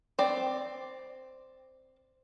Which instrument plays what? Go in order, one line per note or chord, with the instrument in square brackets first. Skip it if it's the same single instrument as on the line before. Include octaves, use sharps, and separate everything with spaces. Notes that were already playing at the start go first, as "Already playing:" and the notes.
[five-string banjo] C4 D5